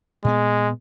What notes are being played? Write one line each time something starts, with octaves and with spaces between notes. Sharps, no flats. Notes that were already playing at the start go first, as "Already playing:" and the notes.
A#2 G#3 B3